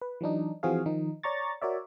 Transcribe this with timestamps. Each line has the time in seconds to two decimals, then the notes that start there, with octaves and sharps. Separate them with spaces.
0.02 B4
0.21 E3 F#3 D4 D#4
0.63 E3 F3 C4 F#4 G#4 F5
0.86 D#3 F3 D#4
1.23 C#5 D5 A#5 C#6 A6
1.62 F#4 A#4 C#5 D5 E5